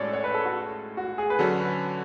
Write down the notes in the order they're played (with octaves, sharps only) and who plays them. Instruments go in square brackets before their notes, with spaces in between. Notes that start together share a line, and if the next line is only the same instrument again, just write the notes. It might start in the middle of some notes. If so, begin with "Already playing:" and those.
Already playing: [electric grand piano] A2 G#3 C#4 F#4 A4 [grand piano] C#5 D5
[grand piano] C#5
B4
A4
F#4
F#4
G#4
B4
[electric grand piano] D3 F#3 C#4 F#4 [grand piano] A4
[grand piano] B4